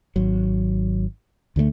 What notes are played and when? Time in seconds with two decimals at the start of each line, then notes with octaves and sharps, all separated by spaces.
0.16 G#1 F#3
1.56 D2 D3 G3 A3